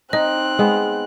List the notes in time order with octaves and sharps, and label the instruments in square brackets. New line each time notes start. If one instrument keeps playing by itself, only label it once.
[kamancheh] C4 F#6 [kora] D#4 [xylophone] D#5
[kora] G#3 B3